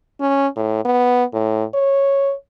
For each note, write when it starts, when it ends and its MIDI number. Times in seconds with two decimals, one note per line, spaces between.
0.21 0.48 61
0.56 0.85 45
0.85 1.24 59
1.34 1.64 45
1.74 2.34 73